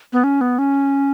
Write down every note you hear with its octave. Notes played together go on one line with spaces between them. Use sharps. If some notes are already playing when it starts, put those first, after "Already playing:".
B3
C#4
B3
C#4